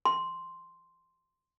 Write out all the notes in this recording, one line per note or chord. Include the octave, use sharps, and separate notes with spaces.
C6